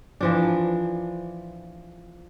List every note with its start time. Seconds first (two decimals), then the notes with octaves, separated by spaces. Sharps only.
0.21 E3 F3 D4